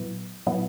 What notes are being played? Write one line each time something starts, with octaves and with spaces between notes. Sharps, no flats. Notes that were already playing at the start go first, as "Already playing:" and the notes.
Already playing: A#2 F#3 B3 E4
A#2 F#3 B3 E4